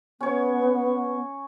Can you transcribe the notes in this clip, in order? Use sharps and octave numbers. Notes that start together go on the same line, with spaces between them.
B3 C#4 C#5